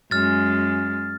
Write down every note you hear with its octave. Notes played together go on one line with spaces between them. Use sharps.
F#2 G#3 F6 A6